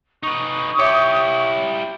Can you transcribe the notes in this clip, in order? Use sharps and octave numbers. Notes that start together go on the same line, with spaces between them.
D#4 B4 C#6 D#6
E4 G4 C#5 E5 D6 C#7